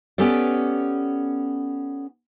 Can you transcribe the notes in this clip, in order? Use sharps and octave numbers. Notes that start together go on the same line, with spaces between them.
B3 C#4 G4 A4 D5